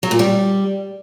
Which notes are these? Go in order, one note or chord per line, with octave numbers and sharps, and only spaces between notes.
F#3
A#2
G3